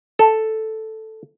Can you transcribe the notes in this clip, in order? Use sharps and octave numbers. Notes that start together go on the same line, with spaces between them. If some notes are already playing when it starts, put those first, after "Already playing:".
A4